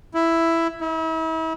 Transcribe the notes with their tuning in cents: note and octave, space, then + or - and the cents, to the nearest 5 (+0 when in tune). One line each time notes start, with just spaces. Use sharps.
E4 +5
E4 -40